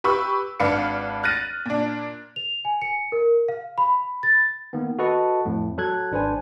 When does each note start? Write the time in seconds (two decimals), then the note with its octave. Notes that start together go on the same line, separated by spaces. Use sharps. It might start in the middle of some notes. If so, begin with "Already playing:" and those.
0.04 G4 B4 B5 C#6 E6
0.60 G#1 D4 B4 F5 C#7
1.23 F6 F#6 A6 A#6 D#7
1.66 A#2 D4
2.36 F7
2.65 G#5
2.82 C#7
3.12 A#4
3.49 F5
3.78 B5
4.23 A6
4.73 D#3 A#3 B3
4.99 F#4 A4 B4 D#5 A5 C#6
5.45 F2 A2
5.78 F#3 A4 F#6 G#6
6.12 G#1 D4 B4 C5 G#5